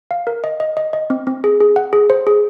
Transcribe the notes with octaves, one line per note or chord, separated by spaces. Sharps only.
F5
A#4
D#5
D#5
D#5
D#5
C4
C4
G#4
G#4
F#5
G#4
C5
G#4